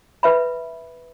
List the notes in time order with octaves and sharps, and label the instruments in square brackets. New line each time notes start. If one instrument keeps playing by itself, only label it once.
[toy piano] B4 E5 B5